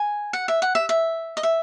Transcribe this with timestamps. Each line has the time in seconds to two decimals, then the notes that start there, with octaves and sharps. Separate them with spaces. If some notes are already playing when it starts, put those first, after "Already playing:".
Already playing: G#5
0.33 F#5
0.48 E5
0.62 F#5
0.75 E5
0.89 E5
1.37 D#5
1.43 E5